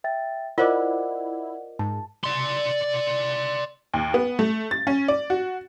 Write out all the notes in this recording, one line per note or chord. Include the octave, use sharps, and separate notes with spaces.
E5 G5 A6
E4 F4 A#4 C5 D5 D#5 F#5 D6
G#2 A5
D5 C6
D#2
B3
A3
A6
C#4
D5
F#4